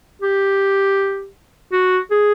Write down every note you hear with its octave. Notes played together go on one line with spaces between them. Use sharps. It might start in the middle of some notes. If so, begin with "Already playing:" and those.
G4
F#4
G#4